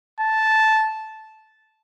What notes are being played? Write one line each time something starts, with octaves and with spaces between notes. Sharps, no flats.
A5